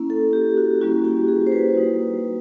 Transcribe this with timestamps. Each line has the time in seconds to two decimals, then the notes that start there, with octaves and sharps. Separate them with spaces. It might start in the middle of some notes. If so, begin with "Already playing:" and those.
Already playing: A#3 C#4 E4
0.10 A4
0.33 G4
0.57 F#4
0.80 G3 A#3 C#4 E4 F#4
1.04 G4
1.28 G#4
1.47 C5
1.52 B4
1.75 G3 A#3 D#4 F#4